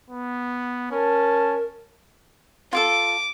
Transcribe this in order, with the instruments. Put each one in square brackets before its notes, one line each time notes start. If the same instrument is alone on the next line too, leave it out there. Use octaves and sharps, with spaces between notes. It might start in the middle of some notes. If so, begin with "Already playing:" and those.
[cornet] B3
[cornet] C#4 [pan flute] A#4 [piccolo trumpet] A5
[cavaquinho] F4 G#4 A4 [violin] D6